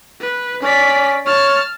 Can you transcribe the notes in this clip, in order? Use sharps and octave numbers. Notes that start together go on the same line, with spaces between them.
B4
C#4 D5 B6
C#5 A5 F6